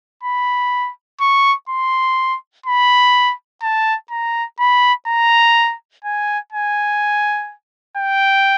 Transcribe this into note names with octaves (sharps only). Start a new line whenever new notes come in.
B5
C#6
C6
B5
A5
A#5
B5
A#5
G#5
G#5
G5